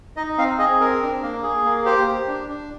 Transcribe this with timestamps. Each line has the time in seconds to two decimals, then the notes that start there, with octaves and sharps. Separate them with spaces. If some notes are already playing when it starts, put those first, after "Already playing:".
0.16 D#4 D#5
0.37 C4 F5
0.59 G#4 D#5
0.80 C4 A#4
1.02 D4
1.22 A#3
1.43 G#4
1.64 A#3
1.85 G4 C5
2.07 G4
2.27 D4
2.48 D4